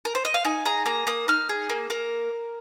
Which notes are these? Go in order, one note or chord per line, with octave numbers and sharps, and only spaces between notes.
A#4
C5
D#5
F5
D#4 G#5
G#4 A#5
A#3 A#5
A#3 D#6
D#4 F6
G#4
A#3
A#3 A#4